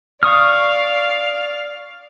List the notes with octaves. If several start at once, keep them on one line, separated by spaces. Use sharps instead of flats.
D5 F5 C#6 D#6 F6